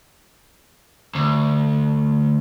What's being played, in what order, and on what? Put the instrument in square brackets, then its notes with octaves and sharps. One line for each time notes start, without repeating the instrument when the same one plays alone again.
[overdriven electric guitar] D2